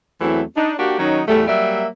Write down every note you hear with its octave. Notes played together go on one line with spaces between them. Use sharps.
E2 E3 F#3 A3 C4 E4
D4 D#4
A#3 D4 F#4 G4
D#3 F#3 C#4 D#4
E2 A2 G3 A3
F#3 G3 A#3 E5